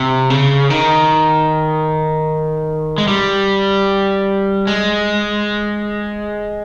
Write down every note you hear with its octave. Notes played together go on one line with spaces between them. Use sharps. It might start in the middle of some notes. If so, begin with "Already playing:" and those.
Already playing: C3
C#3
D#3
G#3
G3
G#3